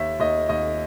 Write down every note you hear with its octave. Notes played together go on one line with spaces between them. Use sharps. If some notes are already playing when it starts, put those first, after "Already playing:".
Already playing: D#2 E5
D#2 D#5
D#2 D#5